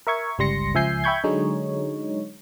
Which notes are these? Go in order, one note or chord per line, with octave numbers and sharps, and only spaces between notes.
A#4 E5 C#6 G#6
G1 C#2 G3 C6 A#6 C#7
C#2 F3 E5 G#5 G6 C7
E5 G5 B5 C#6 G6 G#6
D3 F#3 G#3 D#4 C#5